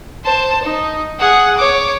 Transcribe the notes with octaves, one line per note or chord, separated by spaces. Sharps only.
C5 A5
D#4
G#4 F#5
C#5 D6